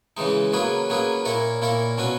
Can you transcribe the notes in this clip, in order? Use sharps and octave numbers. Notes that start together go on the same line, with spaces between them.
C#3 E3 G#3 D#4
F#3 A#3 C#4 G#4 B4
F#3 A#3 C#4 G#4 B4
A#2 A#3 E4 A#4 C#5
A#2 A#3 E4 A#4 C#5
B2 F#3 C#4 F#4 B4